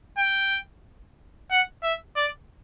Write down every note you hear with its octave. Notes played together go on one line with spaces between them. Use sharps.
G5
F#5
E5
D5